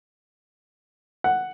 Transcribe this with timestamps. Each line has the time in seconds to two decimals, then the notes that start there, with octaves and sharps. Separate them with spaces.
1.24 F#5